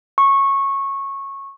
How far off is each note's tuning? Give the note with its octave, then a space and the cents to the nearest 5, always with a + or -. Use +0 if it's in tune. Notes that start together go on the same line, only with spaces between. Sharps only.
C#6 -15